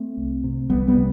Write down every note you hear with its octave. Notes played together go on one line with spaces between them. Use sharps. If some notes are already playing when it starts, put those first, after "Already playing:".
Already playing: A3 C4
C2
C3
C2 G3 B3
G3 B3
C3